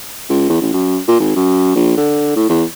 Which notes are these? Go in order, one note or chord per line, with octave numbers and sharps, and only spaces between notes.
C#2
E2
A1
F#2
A#2
G#1
F#2
A#1
D3
A2
E2